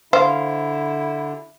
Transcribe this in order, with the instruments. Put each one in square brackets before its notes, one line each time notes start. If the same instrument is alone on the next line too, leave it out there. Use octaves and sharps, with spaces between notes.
[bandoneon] D3 [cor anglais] E4 [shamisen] C5 [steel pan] F5